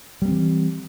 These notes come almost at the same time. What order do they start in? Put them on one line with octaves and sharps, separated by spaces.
G3 A#3 C4 E3